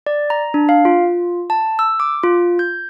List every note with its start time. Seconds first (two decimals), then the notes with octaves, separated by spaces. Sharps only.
0.06 D5
0.30 A#5
0.54 D4
0.69 F5
0.85 F4
1.50 A5
1.79 E6
2.00 D6
2.23 F4
2.59 G6